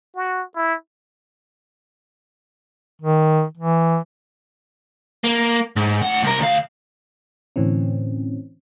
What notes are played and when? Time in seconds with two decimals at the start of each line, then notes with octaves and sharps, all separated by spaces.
0.15 F#4
0.56 E4
3.02 D#3
3.57 E3
5.24 A#3
5.76 G#2
6.01 A2 F#5
6.24 C2 A#4
6.39 D2 F5
7.56 A2 D3 E3 C4 C#4